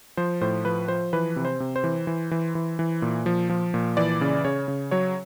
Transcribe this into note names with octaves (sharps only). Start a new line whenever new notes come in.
F3 C5
A2 C5
F3 B4
F3 C5
E3 B4
C3
C5
C3
C5
E3
E3
E3
E3
E3
A#2
F3
F3
A#2
E3 D5
C#3
C#3 C#5
C#3
F#3 C#5